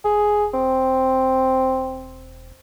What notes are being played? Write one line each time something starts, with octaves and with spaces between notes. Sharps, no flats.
E1 G#4
C4